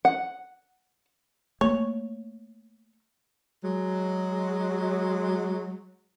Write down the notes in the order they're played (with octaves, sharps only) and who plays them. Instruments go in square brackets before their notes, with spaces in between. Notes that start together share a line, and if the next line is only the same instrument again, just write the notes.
[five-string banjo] F#5
[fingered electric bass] A3 A#3 [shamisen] C#5
[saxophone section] F#3 G#3